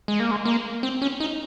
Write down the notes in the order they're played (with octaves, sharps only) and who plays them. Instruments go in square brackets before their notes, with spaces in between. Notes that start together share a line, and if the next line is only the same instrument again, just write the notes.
[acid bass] G#3
A#3
G#3
A#3
C4
C#4
D#4